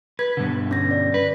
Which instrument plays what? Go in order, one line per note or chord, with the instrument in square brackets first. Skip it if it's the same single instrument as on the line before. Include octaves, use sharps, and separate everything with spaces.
[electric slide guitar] B4 [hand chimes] G#6
[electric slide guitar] G2 B2 D3
[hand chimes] C#4 A#6
D5
[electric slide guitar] B4